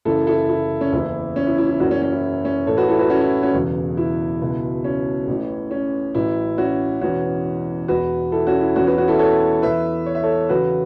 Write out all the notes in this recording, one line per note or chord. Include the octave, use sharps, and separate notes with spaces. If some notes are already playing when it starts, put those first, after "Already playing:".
F#1 F#2 C#3 E3 E4 A4
E4 A4
E4
C#4
F#1 E2 E3 E4
C#4
E4
E4
E4
F#1 F#2 E3 C#4 F#4
C#4 F#4
C#4
E4
E4
C#4
A1 A2 E3 A4 C#5
F#4 B4
E4 A4
F#4 B4
C#4 F#4
E4
C#4 F#4
E1 E2 C#3 F#3
E4
C#2 B2 F#3
C#4
A1 A2 E3
C#4
A1 A2 F#3 E4
C#4 F#4
E1 E2 E3 C#4 F#4
E1 E2 B2 F#4 B4
E4 A4
C#4 F#4
E4
E2 E3 C#4 F#4
F#4 B4
C#4 F#4
E4 A4
A4 C#5
E2 E3 B4 E5
C#5
E5
A4 C#5
E2 C#3 F#3 F#4 B4